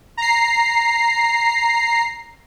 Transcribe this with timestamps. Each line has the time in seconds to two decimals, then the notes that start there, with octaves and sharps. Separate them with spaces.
0.17 A#5 C7